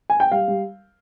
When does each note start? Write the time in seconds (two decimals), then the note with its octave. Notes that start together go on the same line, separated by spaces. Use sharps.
0.10 G#5
0.20 G5
0.32 G3 F5
0.48 G3